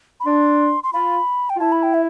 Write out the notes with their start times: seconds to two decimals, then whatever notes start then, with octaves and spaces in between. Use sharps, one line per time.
0.20 B5
0.26 D4 C6
0.84 C6
0.93 F4 B5
1.50 G5
1.56 F4
1.60 E4 A5
1.72 B5
1.83 G5
1.94 E5